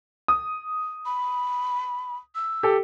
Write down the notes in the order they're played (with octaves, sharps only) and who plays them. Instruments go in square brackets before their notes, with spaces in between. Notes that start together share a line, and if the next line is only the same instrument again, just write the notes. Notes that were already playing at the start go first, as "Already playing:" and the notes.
[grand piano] D#6
[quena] B5
E6
[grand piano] G4 A4